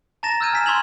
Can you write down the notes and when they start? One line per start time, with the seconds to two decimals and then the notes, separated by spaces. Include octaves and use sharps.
0.23 A5 A#5 A6 A#6 E7
0.41 E6 F6 G6 G#6 D#7
0.53 G#5 B6 E7
0.66 C6 C#6 E6 G#6 F7 F#7